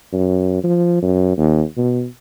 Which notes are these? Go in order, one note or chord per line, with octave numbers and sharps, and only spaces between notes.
F#2
F3
F#2
D#2
B2